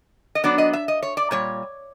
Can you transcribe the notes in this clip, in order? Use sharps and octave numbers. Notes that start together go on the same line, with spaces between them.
D#5
F#3 B3 D4 D5
D#5
E5
D#5
C#5
D5
A#2 G3 C#5